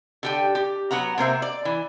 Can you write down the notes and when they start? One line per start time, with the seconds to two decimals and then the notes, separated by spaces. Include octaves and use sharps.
0.23 D3 G4 G5
0.55 G4
0.91 F#3 B3 F#5 A#5
1.18 C3 A#3 C5 E5
1.42 D5
1.65 E3